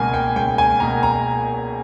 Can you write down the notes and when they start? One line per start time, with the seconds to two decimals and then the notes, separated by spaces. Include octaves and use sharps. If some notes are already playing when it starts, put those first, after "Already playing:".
Already playing: C#2 B2 A#3 G#5
0.14 G5
0.36 C#2 G5
0.58 G#5
0.80 B2 A#3 A#5
1.03 A#5